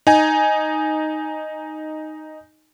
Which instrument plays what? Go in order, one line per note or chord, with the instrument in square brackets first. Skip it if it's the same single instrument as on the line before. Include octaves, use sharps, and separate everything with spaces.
[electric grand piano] D#4 G#5